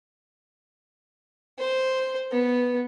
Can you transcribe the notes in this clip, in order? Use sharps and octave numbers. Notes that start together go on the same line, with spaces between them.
C5
B3